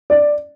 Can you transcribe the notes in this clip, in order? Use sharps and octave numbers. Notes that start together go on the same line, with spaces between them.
D5